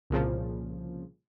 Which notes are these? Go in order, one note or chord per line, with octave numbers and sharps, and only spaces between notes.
C2 A#2 C#3 F3